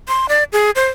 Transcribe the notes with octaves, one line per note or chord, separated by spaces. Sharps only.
C6
D5
G#4
C5